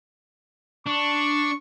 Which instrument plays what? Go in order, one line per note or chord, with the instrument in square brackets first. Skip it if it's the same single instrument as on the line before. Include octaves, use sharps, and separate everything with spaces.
[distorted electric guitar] D4 [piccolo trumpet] C#6